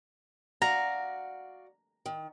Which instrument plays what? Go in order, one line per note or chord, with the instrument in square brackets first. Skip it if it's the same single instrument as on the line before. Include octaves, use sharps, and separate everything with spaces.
[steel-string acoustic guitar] F#4 D5 F5 [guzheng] A#5
[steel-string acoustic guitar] D#3